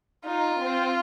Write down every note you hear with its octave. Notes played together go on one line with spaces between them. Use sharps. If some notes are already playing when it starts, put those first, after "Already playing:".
D#4 F4
C4